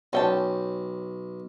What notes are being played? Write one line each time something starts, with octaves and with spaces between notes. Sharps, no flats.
B1 C#4 G5 A5